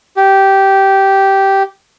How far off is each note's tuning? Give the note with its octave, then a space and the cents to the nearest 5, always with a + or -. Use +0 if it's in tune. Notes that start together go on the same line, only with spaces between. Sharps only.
G4 -10